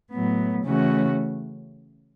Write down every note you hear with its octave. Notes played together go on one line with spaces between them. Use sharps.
A2 F#3 B3
C#3 E3 A3 C#4 F#4